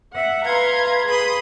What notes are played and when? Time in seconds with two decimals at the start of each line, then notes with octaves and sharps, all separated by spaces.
0.14 E5 F#5
0.45 B4 F5 A#5 C6 G#6
1.06 G#4 B4 B5 C6 D#6